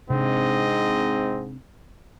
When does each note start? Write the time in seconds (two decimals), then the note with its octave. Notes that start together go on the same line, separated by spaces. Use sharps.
0.10 G#2 C3 C4 D4 D#5